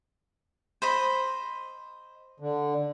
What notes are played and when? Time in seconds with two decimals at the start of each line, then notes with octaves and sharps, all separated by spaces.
0.82 C5 D#5 B5
2.40 D3